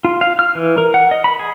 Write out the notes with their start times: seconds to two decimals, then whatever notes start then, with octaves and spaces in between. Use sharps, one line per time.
0.05 F4
0.21 F5
0.39 F6
0.55 E3
0.78 A#4
0.94 F#5
1.11 D#5
1.24 B5
1.39 G#4